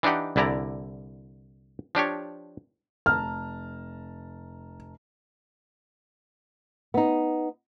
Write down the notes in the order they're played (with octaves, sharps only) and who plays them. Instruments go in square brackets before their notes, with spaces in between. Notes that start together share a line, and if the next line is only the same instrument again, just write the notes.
[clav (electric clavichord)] E3 D4 D#4 G4 F#5
C2 D3 E4 D5 A#5
F3 D4 G4 C#5
[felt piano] F1 A5 A#5 [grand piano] F6
[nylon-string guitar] B3 D#4